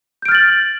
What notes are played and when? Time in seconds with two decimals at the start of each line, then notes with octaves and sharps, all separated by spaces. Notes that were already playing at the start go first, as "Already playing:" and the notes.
0.22 G6
0.25 D7
0.29 F6
0.32 A6
0.35 F#7